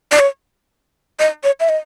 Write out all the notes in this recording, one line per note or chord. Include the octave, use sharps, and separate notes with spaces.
D5
C#5
D#5
C#5
E5
D#5